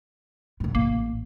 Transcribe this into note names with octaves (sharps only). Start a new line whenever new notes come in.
F1 A2
A1 A#3